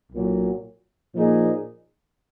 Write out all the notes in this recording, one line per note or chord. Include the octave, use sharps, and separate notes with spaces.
B1 A#2 F#3
A#2 F3 A#3 D#4 G#4